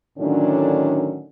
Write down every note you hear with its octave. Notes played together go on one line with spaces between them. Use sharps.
A2 D3 D#3 F#3 C#4 D4